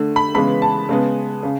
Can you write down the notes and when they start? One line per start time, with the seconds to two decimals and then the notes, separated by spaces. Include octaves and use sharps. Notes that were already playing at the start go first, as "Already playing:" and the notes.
Already playing: D3 A3
0.16 B5
0.34 C#3 E3 G#3 B3 B5
0.62 A5
0.89 C#3 G#3 B3
1.43 C#3